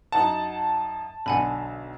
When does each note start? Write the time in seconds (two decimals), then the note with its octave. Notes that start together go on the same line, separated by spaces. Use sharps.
0.12 F#2 D#4 F#5 A5
1.26 B1 D3 F#5 G#5 B5